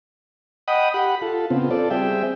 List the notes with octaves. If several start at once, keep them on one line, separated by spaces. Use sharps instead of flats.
D#5 F#5 G5 B5 D#6
G4 F#5 B5
F4 A4
C#3 B3 C4 F4
F4 A4 D5
G3 C4 G#4 E5 G5